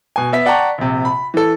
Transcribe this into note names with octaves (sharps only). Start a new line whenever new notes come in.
B2 G#5
B3 E5 B6
D5 F#5 G5 A5 A#5 C#6
A#1 C3
B5
E3 A4